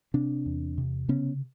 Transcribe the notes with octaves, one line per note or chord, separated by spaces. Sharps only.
C3 C4 D4
E2
C3
C#3 B3 C#4